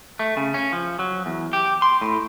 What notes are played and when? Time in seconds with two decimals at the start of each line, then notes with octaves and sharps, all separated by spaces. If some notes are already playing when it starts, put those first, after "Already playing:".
0.19 A3
0.37 C#3
0.54 C#4
0.72 F3
0.99 F#3
1.26 E2
1.53 G4
1.82 C6
2.01 A2